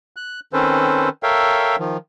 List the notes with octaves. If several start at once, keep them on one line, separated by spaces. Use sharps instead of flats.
F#6
D#3 C4 C#4 A4 B4 C5
A4 A#4 C#5 E5 F5 G5
D#3 F3